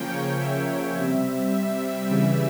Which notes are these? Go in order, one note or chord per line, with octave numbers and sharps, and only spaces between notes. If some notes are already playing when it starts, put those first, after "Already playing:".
Already playing: C#3 F3 A#3 C#4 G5
C#5
E5
C#5
C3 G3 C4 E5
E5
C#3 E3 G3